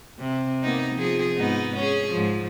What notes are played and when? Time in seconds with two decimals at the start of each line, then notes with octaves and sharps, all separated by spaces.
0.19 C3
0.63 A#3 B3 D#4
0.95 F3 G#4
1.37 G#2 B3 D#4
1.76 C#4 G#4
2.12 G#2 F3